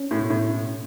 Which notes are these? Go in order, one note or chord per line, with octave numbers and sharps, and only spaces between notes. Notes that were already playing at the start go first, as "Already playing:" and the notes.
Already playing: C#4
A2
B2
A2